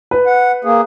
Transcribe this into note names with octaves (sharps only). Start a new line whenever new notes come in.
B4
F#5
A#3 G#4